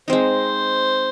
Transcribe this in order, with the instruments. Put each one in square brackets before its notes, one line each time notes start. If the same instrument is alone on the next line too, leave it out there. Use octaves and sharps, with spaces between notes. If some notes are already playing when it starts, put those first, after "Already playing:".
[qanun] G#3 C4 D#4 [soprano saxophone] C5